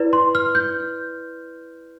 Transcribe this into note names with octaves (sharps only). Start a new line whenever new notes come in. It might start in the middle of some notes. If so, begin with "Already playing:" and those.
Already playing: E4 B4 D5
C6
F6
G6